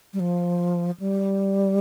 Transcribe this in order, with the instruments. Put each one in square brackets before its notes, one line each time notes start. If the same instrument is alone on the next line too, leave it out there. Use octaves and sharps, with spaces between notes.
[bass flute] G3
F3
G3